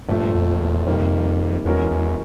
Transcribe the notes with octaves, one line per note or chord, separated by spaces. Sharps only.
G2 A#2 F3 A3
F2
E2
F2 C3 D#3 G3 A#3
E2 E3 G#3 C#4 F#4 A#4
E2